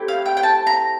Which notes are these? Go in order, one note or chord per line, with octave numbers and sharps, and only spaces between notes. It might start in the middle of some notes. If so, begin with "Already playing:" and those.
Already playing: A3 C4 E4 G4
F5
G5
G5
A5
A#5